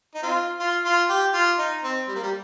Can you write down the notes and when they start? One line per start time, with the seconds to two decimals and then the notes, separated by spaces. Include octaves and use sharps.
0.15 D#4
0.23 C4 F4
0.60 F4
0.85 F4
1.09 G4
1.34 F4
1.59 D#4
1.84 C4
2.08 G3
2.15 A#3
2.23 G3